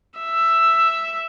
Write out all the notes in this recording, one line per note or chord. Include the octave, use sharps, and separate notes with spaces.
E5